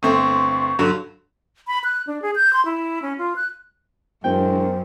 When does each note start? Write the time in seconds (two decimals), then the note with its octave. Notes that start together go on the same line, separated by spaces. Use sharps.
0.03 G1 A3 C4 C#6
0.79 G2 D3 F#3
1.67 B5
1.84 F#6
2.07 D4
2.22 G#4
2.35 G6
2.53 C6
2.65 E4
3.02 C#4
3.18 F4
3.36 F#6
4.24 E1 F#2 F#4 A#4 C5 G5